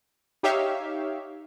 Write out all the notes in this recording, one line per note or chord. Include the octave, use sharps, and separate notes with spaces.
D#4 G4 C#5 E5 F5